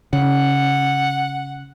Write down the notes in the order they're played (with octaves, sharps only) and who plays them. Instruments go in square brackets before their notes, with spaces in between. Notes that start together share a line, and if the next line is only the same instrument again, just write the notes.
[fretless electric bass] C#3 [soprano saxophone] F#5